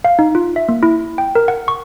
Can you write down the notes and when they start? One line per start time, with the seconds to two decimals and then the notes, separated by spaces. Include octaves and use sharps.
0.04 F5
0.19 D#4
0.35 F4
0.56 E5
0.69 A#3
0.83 E4
1.18 G5
1.35 A#4
1.48 F#5
1.68 C#6